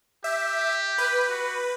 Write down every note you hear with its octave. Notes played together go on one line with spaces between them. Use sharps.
G4 E5
B4
F#4